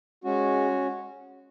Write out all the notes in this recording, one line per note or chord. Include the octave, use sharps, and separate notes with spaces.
G#3 C#4 F#4